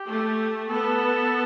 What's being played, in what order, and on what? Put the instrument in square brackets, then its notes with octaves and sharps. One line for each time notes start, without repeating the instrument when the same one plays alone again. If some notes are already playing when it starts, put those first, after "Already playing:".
Already playing: [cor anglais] G4
[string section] A3
[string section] B3 [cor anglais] A4